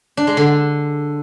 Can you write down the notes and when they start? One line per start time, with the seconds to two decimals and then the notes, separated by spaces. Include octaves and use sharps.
0.17 D4
0.27 G#3
0.37 D3